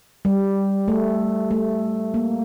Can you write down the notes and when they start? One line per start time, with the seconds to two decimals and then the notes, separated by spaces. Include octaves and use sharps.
0.25 G3
0.88 A3
1.51 A3
2.14 A#3